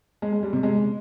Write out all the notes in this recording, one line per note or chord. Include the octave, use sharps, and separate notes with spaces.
G#3
G#3
G3
C3
G#3